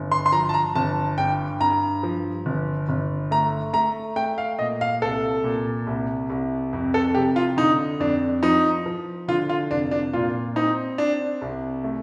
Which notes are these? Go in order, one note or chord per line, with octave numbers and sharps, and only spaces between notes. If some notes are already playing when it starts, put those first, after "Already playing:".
Already playing: G1
C6
C6
F3 A#5
A5
A#5
G1 A5
G2 G5
G2 A#5
F3
G1
G1
A3 A#5
A3 A#5
A3 G5
F5
A#2 D#5
F5
C2 A4
A#2
C2
C2
F2
A4
F1 G4
F4
D3 D#4
F2 D4
F3 D#4
F3
D3 F4
F4
F1 D4
D4
A#2 F4
C4 D#4
C4 D4
C2
A3